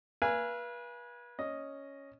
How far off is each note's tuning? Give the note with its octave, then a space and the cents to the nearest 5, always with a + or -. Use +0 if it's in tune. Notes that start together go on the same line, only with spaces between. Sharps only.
B4 -35 F5 -35 G#5 -5
C#4 +0 D#5 +0